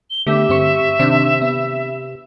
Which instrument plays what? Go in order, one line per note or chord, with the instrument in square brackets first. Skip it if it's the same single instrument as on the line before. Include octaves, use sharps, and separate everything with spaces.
[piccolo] G7
[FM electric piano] D3 A3 B3 [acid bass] G4 [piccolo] E5
[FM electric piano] G2 C4 C#6
[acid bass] C3 [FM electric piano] D#3 C4 D4
[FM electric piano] B3